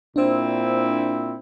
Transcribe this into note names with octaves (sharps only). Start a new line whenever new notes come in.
A#2 C4 D4 E4 C5